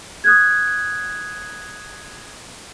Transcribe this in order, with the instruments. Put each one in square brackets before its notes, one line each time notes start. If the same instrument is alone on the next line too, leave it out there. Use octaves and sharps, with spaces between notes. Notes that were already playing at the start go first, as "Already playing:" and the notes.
[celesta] D#6 F#6 G#6